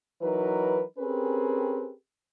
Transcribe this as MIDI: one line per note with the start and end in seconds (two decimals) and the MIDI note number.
0.22 0.82 52
0.22 0.82 54
0.22 0.82 63
0.22 0.82 70
0.22 0.82 71
0.98 1.91 60
0.98 1.91 61
0.98 1.91 67
0.98 1.91 68
0.98 1.91 70
0.98 1.91 71